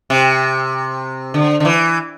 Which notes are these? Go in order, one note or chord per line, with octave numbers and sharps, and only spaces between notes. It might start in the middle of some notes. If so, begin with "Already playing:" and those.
C3
D3
D3
E3